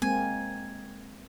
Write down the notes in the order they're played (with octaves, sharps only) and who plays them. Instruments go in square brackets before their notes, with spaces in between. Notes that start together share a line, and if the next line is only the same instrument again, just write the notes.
[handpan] G#3 A#3 C4 [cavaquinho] G#5